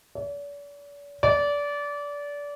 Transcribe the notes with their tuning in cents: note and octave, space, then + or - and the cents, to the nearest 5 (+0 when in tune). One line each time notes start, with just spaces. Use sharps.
D5 -45
D5 -25